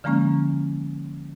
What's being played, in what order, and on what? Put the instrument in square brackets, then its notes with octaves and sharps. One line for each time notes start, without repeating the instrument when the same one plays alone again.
[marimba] D3 F3 G#3 A#3 C#4